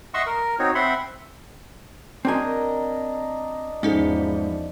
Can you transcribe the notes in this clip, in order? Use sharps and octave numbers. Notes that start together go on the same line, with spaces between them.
D#5 E5 F#5 C6 C#6 E6
A#4
C4 D#4 F#4 C#5
C4 E5 F#5 B5 C6
C4 D4 A#4 D#5 G#5
E2 G#2 F3 C#4 D#4 A4